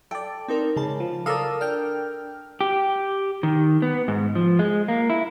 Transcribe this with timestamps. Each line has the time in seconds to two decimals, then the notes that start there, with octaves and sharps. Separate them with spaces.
0.11 A4 D5 G5
0.48 C4 D#4 A#4
0.76 C#3 G#3 A5
1.00 F3
1.26 A4 A#4 D5 F5 D#6 E6
1.61 D4 G5 F6
2.61 G4
3.43 D#3
3.82 B3
4.08 G#2
4.35 F3
4.59 G#3
4.88 A#3
5.10 E4